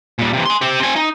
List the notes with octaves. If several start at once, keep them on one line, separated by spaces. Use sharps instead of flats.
A#2 G3
C3 E3
G#5 C6
G4 C5
C4 G#5
D#4